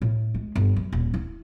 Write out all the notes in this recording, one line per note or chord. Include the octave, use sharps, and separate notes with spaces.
A2
G#3
G1
F#2
D#1
E4